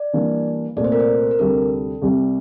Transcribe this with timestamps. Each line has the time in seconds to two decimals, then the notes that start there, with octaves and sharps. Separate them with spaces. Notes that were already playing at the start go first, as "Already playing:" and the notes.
Already playing: D5
0.13 E3 G3 A#3 D4
0.76 C2 A#2 A3 D5
0.84 C5
0.92 A#4
1.00 C5
1.31 A#4
1.39 D2 C3 G3 A4
2.02 C2 C3 G3